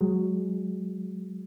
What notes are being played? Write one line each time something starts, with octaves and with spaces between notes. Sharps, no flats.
F#3 G#3